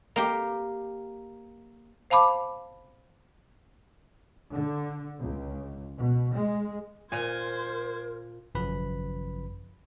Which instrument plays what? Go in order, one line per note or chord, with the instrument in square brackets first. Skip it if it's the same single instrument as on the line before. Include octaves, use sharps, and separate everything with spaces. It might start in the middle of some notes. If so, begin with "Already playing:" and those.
[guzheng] A#3 G4
[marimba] C5 F5 A5 B5 D6
[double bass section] D3
C#2
B2
G#3
[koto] A#2 G#5 [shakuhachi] A#4 [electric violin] C5 G#6
[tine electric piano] G#1 F#2 C#3 F3 B4 B5